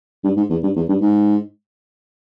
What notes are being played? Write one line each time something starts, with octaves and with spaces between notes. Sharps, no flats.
G2
G#2
E2
G2
E2
G2
G#2